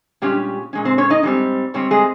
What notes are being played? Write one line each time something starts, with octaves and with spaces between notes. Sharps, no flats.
A#2 G3 G#3 C#4 G4
A#2 G#3 C#4
C4 C5
C#4 C#5
D#4 D#5
G#2 G3 C4
G#2 G3 C4 C#5
G#3 G#4